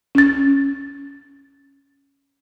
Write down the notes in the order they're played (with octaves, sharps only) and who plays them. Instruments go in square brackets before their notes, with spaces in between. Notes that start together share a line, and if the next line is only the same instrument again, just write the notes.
[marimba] C#4 A6